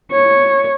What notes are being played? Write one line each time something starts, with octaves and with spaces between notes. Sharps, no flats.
C#5